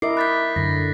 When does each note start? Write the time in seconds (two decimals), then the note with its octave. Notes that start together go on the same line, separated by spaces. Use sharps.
0.02 E4 A#4 D#5 E5 D6 C7
0.17 B5 F#6 G6 A6 B6
0.56 F#2 D3 A#6